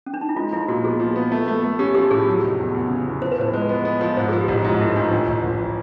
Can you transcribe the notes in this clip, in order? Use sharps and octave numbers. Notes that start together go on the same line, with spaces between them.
C#4
D4
D#4
E4
G#3 F4
F3 E4
A#2 F#4
B3 G#4
F3
B3
A3
A3
A3
C#4 G4
F3 G4
A2 G#4
F#3
F1
E2
E2
C#3
E2
F3 C5
B4
A2 C5
G#3
B3
B3
F3
G#2 C5
F3 G#4
G4
A1
G#2 F4
A3 E4
F3 D4
A1
A1
A1
E3